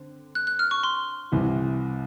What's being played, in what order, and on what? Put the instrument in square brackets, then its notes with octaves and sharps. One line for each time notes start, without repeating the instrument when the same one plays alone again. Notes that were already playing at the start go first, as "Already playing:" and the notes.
Already playing: [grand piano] D3 C4
[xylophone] F#6
F#6
F6
C#6
C6
[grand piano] C2 C3 E3